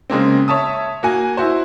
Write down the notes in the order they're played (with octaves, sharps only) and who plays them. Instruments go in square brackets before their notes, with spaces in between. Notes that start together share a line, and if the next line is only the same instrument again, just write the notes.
[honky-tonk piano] C#3 G#3 A#3 C4
C#5 E5 A5 D#6
A#3 F#4 G#5
E4 F#4 C5